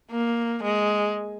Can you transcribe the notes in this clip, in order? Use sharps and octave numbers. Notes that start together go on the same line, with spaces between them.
A#3
G#3